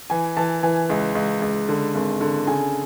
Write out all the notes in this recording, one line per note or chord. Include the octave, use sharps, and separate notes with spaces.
E3 G#5
E3 A5
E3 G#5
C#2
C#2
C#2
D3
G#1
D3
C#3 G#5